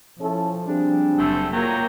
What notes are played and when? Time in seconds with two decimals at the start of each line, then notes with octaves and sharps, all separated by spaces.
0.20 F3 C#4 E4 A4
0.67 G3 C4 D4 G#4
1.19 F#1 D3 A3 G5
1.53 F#3 A#3 F4 G5 A#5